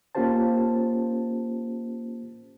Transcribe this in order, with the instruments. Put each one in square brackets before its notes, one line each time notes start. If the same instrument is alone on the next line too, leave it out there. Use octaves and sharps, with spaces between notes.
[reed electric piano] A#3 C#4 F4 G4 C5 A5